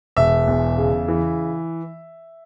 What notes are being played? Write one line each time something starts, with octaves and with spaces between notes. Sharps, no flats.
E1 E5
E2
C#3
E3